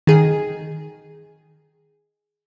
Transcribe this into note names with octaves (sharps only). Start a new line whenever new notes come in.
D#3 G#4